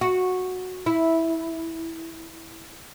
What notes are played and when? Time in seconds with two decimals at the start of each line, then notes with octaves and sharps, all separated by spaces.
0.01 F#4
0.86 E4